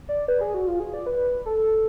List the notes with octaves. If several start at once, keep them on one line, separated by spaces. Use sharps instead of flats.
D5
B4
G#4
F#4
F4
G#4
D5
B4
A4